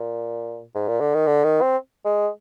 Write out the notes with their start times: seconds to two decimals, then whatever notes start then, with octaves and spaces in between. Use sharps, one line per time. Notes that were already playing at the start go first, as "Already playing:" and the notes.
Already playing: A#2
0.75 G#2
0.88 A#2
1.01 D3
1.15 D#3
1.27 D3
1.44 D#3
1.62 C4
2.05 G#3